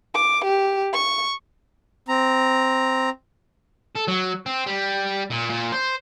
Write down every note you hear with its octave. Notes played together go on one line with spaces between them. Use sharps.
D6
G4
C#6
C4 A#5
A4
F#3
C4
G3
A#2
A#2
C5